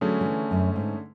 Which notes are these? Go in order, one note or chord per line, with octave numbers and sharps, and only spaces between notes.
D3 F#3 A3 C#4 G#4
F#3
E3
F#2
G#2